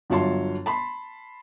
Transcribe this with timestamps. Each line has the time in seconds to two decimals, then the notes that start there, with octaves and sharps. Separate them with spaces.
0.10 G1 F#3 F4 C#5 A5 C6
0.66 A5 B5 C6